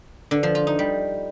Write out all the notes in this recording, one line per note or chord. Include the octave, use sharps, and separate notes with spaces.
D3
F3
F4
D#4
G3